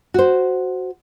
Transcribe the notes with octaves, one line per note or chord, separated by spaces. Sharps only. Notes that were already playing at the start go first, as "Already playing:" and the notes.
F#4 C5